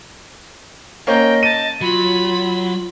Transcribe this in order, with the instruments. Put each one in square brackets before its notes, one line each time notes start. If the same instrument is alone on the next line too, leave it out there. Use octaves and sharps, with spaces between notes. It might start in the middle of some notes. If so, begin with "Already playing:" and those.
[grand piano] A#3 C#4 [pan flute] D#5 [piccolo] G5
[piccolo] A5 [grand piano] D#7
[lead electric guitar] F#3 [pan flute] F4 [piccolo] B5